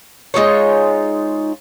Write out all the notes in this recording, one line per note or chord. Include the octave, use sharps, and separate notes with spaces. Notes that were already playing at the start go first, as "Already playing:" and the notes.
G#3 D#4 F4 C#5